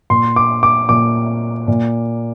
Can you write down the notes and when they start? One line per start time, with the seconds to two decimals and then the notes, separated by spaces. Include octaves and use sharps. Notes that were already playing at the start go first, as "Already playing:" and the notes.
0.10 A#2 C6
0.36 D6
0.63 D6
0.89 A#2 D6
1.68 A#2